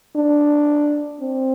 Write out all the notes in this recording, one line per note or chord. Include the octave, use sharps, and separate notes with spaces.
D4
C4